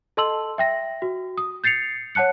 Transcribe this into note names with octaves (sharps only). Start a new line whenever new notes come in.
A4 D#5 A5 C6 E6 F#7
E5 G5 A#6
F#4
D#6
G6 A6 C7 C#7 F7
C#5 F#5 A5 F#6 C#7